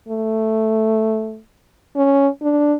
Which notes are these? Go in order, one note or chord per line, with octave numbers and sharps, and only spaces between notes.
A3
C#4
D4